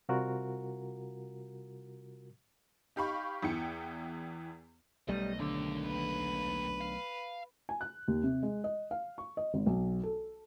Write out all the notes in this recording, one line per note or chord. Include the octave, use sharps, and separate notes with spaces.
C3 G3 F4 F#4 A#4
D#4 G4 F5 B5 C#6
E2 E3 G5 C#7
B1 G3 A3 D#5
D#2 D3 G4
B4
F5
G#5
F#6
D#2
C3
G#3
D#5
F5
C#6
D#5
G#1
B1
A4